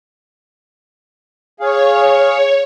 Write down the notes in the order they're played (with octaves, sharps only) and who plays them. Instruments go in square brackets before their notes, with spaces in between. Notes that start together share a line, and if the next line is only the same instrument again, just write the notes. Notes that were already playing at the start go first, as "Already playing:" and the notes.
[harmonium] G#4 F5 [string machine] C#5